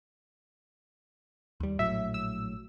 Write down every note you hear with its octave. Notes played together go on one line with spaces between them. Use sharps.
D#2 G3
A#1 A2 F#3 E5
E6